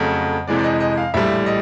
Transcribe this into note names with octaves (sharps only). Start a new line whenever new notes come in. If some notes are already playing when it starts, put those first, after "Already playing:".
Already playing: F2 C#3 F#3 A3
F2 C3 E3 G#3 D5
D5
D#5
D#5
F5
A#1 A2 E3 G3 E5
D#5